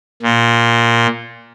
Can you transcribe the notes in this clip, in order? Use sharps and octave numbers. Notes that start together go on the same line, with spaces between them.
A#2